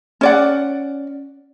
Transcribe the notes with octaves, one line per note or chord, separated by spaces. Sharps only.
C#4 D5 F#5